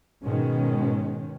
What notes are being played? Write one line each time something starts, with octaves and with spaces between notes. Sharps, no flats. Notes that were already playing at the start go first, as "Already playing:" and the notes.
G#2 B2 D#3 G#3 C#4